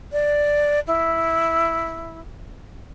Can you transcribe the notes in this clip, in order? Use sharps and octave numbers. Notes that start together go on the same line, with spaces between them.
D5
E4